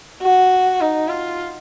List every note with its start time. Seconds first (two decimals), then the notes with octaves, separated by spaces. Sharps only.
0.22 F#4
0.80 D#4
1.08 F4